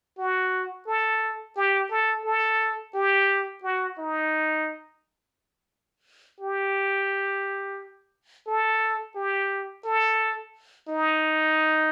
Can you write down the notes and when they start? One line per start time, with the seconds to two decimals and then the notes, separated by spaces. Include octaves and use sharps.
0.18 F#4
0.87 A4
1.57 G4
1.91 A4
2.25 A4
2.94 G4
3.63 F#4
3.98 D#4
6.40 G4
8.47 A4
9.16 G4
9.85 A4
10.88 D#4